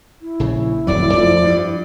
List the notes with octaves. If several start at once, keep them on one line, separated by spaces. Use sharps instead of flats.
E4
A#1 C#3
D1 F2 F#3 D5
F2 F3 A3
G2